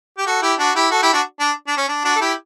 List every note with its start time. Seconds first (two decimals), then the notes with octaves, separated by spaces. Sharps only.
0.17 G4
0.26 F#4 A4
0.42 E4 G4
0.58 D4 F#4
0.75 E4 G4
0.91 F#4 A4
1.02 E4 G4
1.13 D4 F#4
1.39 D4
1.67 D4
1.77 C#4
1.89 D4
2.05 D4 F#4
2.16 A4
2.21 E4 G4